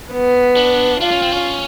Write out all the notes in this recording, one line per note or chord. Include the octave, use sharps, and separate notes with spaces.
B3
D4
D4 F4
C#4
C4
C#4